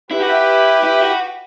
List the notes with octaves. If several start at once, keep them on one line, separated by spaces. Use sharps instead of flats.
E4 G4 B4
F#4
E4
E4
F#4